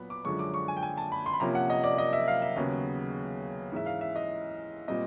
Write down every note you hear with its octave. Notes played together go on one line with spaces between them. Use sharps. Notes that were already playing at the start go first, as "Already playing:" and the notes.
Already playing: A#2 F#3 B3 B5
D6
F#2 D3 F3 G#3 C#4 C#6
D6
C#6
G#5
G5
G#5
A5
B5
C6
B5
C3 F3 A#3 C#4 A#5
F#5
D#5
D5
D#5
E5
F5
E5
D#2 C#3 F#3 B3
G#2 E3 G#3 C#4 E5
F5
E5
D#5
A#2 G3 C4 D#5